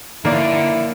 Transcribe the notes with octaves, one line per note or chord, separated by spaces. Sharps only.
D3 A#3 D#4 E4 C#5 D5